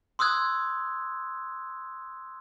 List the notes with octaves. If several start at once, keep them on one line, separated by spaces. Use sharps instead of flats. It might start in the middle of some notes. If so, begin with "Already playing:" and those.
C6 D#6 E6 F#6 G#6